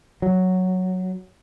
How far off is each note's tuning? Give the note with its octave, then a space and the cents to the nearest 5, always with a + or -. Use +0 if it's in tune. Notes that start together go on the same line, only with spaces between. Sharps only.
F#3 +0